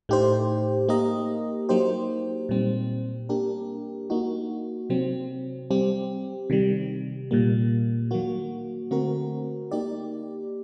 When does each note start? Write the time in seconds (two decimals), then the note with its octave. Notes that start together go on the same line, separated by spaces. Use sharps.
0.09 A2 A3 D#4 G4 C5
0.89 A#3 D#4 G4 A#4 D#5
1.69 F#3 A#3 D#4 G4 C5
2.49 A#2 G3 C4
3.29 A#3 D4 G4 A#4
4.10 A#3 D#4 F#4
4.90 C3 F#3 C4
5.71 G3 C4 G4
6.50 C3 D#3 G3
7.31 A#2 G3 A#3
8.11 D#3 F#3 A#3 F#4
8.91 D3 A3 C4 F#4 A#4
9.71 A#3 D#4 G4 D5